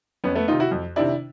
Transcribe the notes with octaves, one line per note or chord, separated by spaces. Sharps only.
F2 B3 C#4
A3 B3
C3 D#3 D#4 F4
E4 F#4
F2
C3 D#3 D4 E4